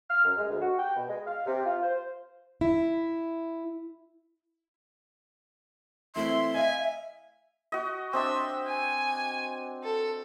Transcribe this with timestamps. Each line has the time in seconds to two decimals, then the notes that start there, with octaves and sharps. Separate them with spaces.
0.09 F6
0.24 F#2
0.37 G#3
0.49 D2
0.61 F#4
0.78 G5
0.96 B2
1.08 G#3
1.26 F5
1.46 C3
1.66 F4
1.82 C5
2.61 E4
6.16 E3 A3 C4 E5 C6
6.55 D#5 F5 G#5
7.72 F#4 D#5
8.13 C4 D4 D#5 E5
8.66 G#5
9.83 A4